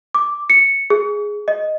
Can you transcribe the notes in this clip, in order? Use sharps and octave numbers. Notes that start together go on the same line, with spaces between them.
D6
C#7
G#4
D#5